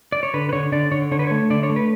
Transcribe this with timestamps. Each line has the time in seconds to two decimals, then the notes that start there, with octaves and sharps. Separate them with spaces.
0.12 D5
0.23 C#5
0.34 D3 B4
0.49 B4
0.53 D3 C#5
0.72 D3 D5
0.91 D3 C#5
1.11 D3 C#5
1.19 B4
1.27 A3 C#5
1.50 D3 D5
1.63 C#5
1.70 A3
1.76 B4